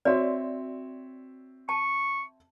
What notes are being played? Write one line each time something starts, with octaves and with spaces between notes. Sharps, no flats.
C4 F#4 C#5 D5 E5
A5 C#6